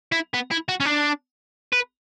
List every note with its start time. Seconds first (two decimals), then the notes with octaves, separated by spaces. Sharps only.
0.12 E4
0.34 B3
0.51 E4
0.69 F#4
0.80 C#4
0.85 D4
1.73 B4